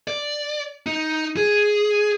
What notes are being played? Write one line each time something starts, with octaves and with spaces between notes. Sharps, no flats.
D5
D#4
G#4